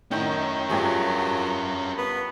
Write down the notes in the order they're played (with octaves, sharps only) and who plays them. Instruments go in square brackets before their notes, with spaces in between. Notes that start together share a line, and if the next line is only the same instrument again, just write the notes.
[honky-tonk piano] A2 D#3 [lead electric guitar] C#4 A#4 [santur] D#4 G5
[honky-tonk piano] G2 F3 [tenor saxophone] F#3 [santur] G4 G#4 G#5
[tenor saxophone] B3